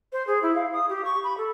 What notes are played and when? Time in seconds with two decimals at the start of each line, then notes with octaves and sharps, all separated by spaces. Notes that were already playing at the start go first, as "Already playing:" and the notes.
0.12 C5
0.27 G#4
0.42 E4
0.55 F5
0.73 D#6
0.89 G4
1.04 C#6
1.24 B5
1.37 A4